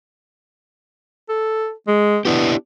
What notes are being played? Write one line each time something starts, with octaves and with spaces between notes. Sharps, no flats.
A4
G#3
B3 D4 E4 G4